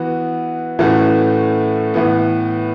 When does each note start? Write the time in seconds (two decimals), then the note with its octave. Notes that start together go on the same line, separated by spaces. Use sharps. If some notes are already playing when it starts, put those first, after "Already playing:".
Already playing: E3 B3 F#4
0.79 A2 E3 A3 C#4 F#4
1.94 A2 E3 B3